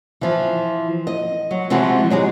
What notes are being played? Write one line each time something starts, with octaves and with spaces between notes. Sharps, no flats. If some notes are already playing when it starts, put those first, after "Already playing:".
E3 F3
D#5
F#3
C3 E3 F3 G#3 F#4
F#3 G#3 G4 G#4